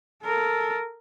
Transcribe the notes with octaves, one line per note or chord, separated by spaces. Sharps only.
A4 A#4